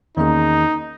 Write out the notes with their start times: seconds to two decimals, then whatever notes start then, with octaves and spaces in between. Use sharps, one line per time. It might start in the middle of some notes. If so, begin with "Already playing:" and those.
0.17 E2 D#3 A#3 C#4 D#4 G#4